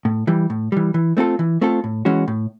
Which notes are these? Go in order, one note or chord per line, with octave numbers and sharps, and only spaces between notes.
A2
E3 G3
A2
E3 G3
E3
A3 C4 F4 A4
E3
A3 C4 F4 A4
A2
E3 G#3 C#4 F#4
A2